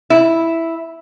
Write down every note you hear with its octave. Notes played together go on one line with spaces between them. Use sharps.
E4